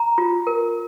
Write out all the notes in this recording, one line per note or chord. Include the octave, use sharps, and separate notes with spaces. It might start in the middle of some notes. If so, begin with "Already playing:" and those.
Already playing: A#5
F4
A#4